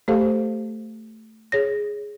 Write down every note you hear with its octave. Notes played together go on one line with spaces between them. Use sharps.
A3 G4 A4 C5 F5
G#4 C#5 A#6